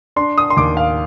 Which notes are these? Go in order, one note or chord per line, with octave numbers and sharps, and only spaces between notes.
D4 C6
D#6
C6
D#2 D6
F5